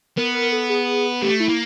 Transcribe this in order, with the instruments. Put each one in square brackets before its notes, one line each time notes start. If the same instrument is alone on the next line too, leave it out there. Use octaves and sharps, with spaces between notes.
[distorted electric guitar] B3 [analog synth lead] A#4
[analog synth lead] A#4
A4
G#4
[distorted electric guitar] A3 [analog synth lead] G4
[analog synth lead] E4
[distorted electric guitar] A#3